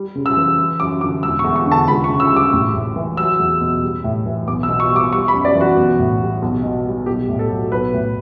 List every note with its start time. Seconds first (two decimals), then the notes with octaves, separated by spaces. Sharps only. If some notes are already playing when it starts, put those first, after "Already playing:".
Already playing: G3
0.15 C#3
0.26 E6
0.37 E3
0.58 G3
0.80 F#2 D6
1.01 D3 D6
1.23 E1 E6
1.39 C#6
1.44 E2
1.56 C#6
1.66 D3
1.72 A5
1.88 C#2 B5
2.04 C#6
2.09 C#3
2.20 E6
2.31 G3
2.36 D6
2.53 A1
2.74 A2
2.96 E3
3.17 F#3 E6
3.39 E2
3.61 B2
3.82 G3
4.04 A2
4.26 E3
4.47 B1 D6
4.63 E6
4.69 B2
4.80 C#6
4.91 G3
4.96 D6
5.12 G3 C#6
5.28 B5
5.34 F#2
5.45 D5
5.56 E3
5.61 F#4
5.77 B1
5.99 A2
6.20 G3
6.42 B1
6.63 B2
6.85 G3
7.06 B1 G4
7.28 A2
7.39 A4
7.50 F#3
7.72 B1 B4
7.93 A2